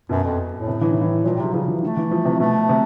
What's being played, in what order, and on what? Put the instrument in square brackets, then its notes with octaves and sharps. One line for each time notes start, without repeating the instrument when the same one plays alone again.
[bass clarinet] F#2 [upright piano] B2
[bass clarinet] F2
A2
[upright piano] C3
E3
D#3
E3
[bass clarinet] A#2 [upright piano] F3
[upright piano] G3
[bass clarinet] C3 [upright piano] F#3
[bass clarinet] C#3 [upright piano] F3
[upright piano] E3
[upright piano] D#3 [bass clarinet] A3
[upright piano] E3
F3
C3
[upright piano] B2 [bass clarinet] A3
[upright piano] C3